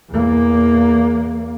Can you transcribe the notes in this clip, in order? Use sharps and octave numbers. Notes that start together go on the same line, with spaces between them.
E2 A#3